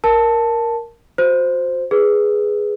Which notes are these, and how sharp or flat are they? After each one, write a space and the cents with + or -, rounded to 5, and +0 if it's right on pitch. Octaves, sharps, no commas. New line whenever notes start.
A#4 +0 A5 +0
F#4 -30 C5 -5
G#4 +0 B4 +0